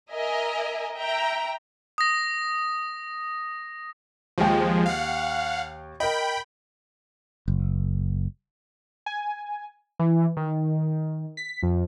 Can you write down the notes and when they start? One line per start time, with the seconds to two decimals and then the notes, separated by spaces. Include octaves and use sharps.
0.14 A#4 D#5 E5 G#5 A#5
0.96 E5 G5 A#5
1.98 D#6 A#6
4.38 D#2 F3 G#3 G5
4.86 F5 F#5
6.00 A#4 D#5 G5 B5
7.48 F#1
9.06 G#5
9.99 E3
10.37 D#3
11.37 B6
11.63 F2